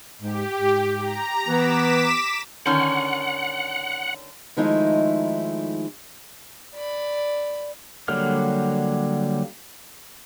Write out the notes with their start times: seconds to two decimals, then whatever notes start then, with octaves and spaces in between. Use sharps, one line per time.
0.22 G#2 G4
0.58 G#2
1.00 A#5
1.48 E3 B3 D6 B6 E7
2.66 D3 D#3 C#4 F#5
4.57 D#3 F3 G#3 A3 D#4 E4
6.75 D5 B5
8.08 D3 F#3 G3 A#3 F6